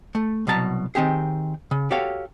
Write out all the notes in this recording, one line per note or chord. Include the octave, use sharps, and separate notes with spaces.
A3
C2 B2 F#3 A5 A#5
D#3 C4 G4 G#4
C#3
F#4 G4 A4 C#5 F5